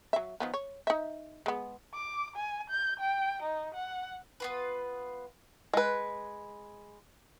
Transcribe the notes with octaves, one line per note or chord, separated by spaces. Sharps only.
F#3 E5
D#3 F3 B3
C#5
D#4 E5
G#3 B3
D6
G#5
G6
G5
D#4
F#5
B3 F4 B4
G#3 B4